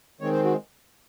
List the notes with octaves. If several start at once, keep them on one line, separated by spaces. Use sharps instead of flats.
D#3 G#3 C4 C#5
C5
F#4